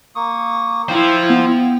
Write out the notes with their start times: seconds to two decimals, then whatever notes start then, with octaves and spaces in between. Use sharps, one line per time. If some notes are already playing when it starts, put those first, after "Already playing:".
0.15 A#3 C#6 D#6
0.89 E4 F4 C5 G5
1.30 B3